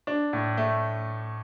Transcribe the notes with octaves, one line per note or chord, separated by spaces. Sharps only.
D4
A2
A3